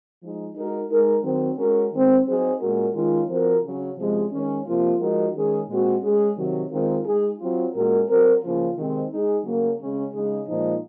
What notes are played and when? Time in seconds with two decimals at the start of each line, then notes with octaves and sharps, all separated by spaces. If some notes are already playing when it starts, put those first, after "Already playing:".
0.21 F3 G#3 D#4
0.55 G#3 D#4 F#4 A#4
0.89 G#3 D#4 A#4
1.23 D#3 F#3 C4
1.58 G#3 C#4 F#4 A#4
1.92 D#3 G#3 C4
2.26 F#3 C4 D#4 G#4
2.60 A#2 G#3 C#4 F#4 A#4
2.94 D#3 G#3 C#4 F4
3.28 F3 C4 F#4 A#4
3.63 C#3 F#3 C#4
3.97 C3 F3 G#3 C#4 G#4
4.31 D#3 G#3 C#4
4.65 C3 F3 A#3 F4
4.99 F3 G#3 D#4 F#4 A#4
5.34 D#3 G#3 C#4 G#4
5.68 A#2 G#3 C4 F#4
6.02 G#3 C#4 G#4
6.36 C3 D#3 F#3
6.70 D#3 G#3 C4 F4 A#4
7.04 G#3 D#4 G#4
7.39 F#3 C4 F4
7.73 A#2 G#3 C#4 F#4 A#4
8.07 F#3 C4 F#4 A#4
8.42 C#3 F3 A#3 F4
8.76 C3 D#3 G#3 C4
9.10 G#3 D#4 G#4
9.44 C#3 F#3 A#3
9.78 C#3 G#3 C#4
10.13 C#3 G#3 D#4 G#4
10.46 A#2 F3 G#3 D#4